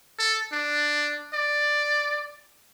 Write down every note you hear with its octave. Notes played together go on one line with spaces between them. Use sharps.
A4
D4
D5